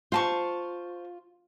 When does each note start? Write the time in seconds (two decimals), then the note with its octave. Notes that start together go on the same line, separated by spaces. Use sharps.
0.12 F4 C5 A5 C#6